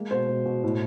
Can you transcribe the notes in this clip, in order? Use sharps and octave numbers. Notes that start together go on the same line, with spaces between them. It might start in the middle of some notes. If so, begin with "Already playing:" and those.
Already playing: G#3 A#3
B2 C5
B2
B2
A2